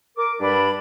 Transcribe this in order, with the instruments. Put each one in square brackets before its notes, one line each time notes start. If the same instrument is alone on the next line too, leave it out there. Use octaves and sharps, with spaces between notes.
[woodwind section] A#4 D6
G2 G3 D4 D5 B5